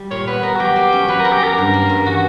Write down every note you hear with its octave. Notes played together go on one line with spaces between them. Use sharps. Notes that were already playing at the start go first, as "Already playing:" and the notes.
Already playing: G3
A#2 C#5
B3 B4
B3 A#4
F#4
F#3 G4
A#3
C#4
F#3 B4
C#4 A#4
G4
F#3 A#4
G2
A#3
G2
E3 F#4